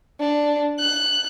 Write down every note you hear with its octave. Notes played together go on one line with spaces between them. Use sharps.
D4
F#6